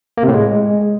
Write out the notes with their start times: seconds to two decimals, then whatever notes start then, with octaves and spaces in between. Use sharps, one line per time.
0.18 A#3
0.23 C3
0.28 A2
0.34 G#3